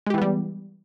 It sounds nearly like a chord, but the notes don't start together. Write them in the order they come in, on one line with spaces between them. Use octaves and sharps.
G#3 G4 E3 B3 G3